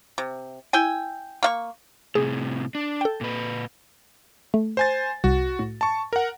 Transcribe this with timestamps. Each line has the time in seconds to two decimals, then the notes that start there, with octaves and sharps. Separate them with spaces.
0.18 C3
0.73 E4 G5 G#5
1.43 A#3 F5 C#6
2.15 A2 C3 G#4
2.75 D4
3.01 A4 G5
3.21 A#2 B4
4.54 A3
4.77 C5 G#5 A6
5.24 C2 F#4
5.59 A2
5.81 A5 C#6
6.13 A#4 F#5